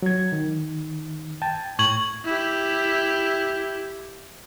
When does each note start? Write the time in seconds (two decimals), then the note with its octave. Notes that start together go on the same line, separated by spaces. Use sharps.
0.02 F#3 G#6
0.32 D#3
1.42 G5 A5
1.79 A2 C#6 G#6 F#7
2.25 E4 G4